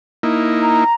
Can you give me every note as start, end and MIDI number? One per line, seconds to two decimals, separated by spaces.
0.23 0.84 58
0.23 0.84 63
0.23 0.84 64
0.61 0.94 82